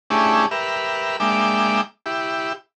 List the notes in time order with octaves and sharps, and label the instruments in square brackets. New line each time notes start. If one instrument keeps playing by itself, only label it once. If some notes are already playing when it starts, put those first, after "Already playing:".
[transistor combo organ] A3 C#4 D4 E4 G4 G#4
G4 A#4 B4 E5
G#3 A#3 D4 E5 G5 D6
E4 G4